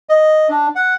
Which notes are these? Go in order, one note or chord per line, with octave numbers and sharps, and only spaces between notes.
D#5
D4
F#5